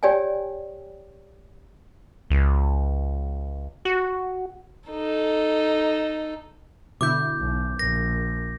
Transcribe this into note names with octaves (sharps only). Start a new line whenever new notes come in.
G4 C#5 D5 G5 G#5
C#2
F#4
D#4 A4
B2 D3 E4 D6 G6
B1
A#1 A#6